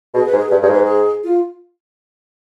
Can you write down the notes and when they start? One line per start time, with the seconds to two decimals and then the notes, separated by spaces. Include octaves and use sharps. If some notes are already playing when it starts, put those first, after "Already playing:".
0.14 B2 G#4
0.26 B4
0.33 G#2
0.38 G#4
0.49 G2 B4
0.61 G2 G#4
0.69 G#2 B4
0.83 G#4
1.24 F4